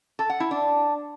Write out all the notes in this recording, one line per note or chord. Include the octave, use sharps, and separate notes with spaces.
A4
F#5
E4
D4